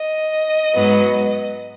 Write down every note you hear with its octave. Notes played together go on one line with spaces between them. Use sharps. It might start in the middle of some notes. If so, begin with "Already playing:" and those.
Already playing: D#5
G#2 F#3 B3